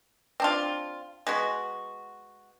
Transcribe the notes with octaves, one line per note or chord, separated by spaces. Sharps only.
C4 D4 F4
G#3 B3 F#4